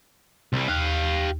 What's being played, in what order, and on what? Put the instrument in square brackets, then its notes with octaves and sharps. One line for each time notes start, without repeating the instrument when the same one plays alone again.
[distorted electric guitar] C2 G3
[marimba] D#2 F#6 [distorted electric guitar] G4 F5